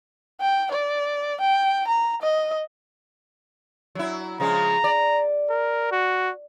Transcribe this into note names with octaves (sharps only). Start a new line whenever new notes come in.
G5
D5
G5
A#5
D#5
F#3 E4
C#3 F3 G#3 A#5
D5
A#4
F#4